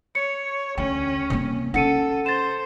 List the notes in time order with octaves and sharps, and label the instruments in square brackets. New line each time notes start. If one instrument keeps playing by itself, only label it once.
[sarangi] C#5 [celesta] C#7
[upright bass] D2 [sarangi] C#4 [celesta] G5
[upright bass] C3 A#3
[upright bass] C#4 [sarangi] A4 [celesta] F#5 C#7 D#7
[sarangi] C5 [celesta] A6 E7